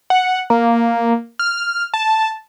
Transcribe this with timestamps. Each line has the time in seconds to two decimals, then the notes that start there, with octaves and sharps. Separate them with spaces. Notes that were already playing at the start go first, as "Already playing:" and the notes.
0.10 F#5
0.50 A#3
1.39 F6
1.94 A5